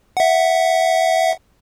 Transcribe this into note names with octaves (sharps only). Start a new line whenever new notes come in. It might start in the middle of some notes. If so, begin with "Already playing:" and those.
E5 F#5